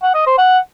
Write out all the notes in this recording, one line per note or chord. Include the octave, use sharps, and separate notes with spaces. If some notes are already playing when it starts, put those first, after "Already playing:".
F#5
D#5
C5
F#5